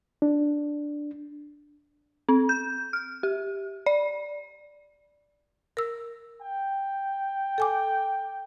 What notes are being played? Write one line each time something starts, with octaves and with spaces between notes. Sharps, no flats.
D4
C4
G6
F6
G4
D5
A#4 E6
G5
A4 G#5 D6